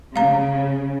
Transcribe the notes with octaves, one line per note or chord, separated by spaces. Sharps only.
C#3 F5 A#5